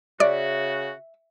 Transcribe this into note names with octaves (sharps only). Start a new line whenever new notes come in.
C#3 F#4 D5 E5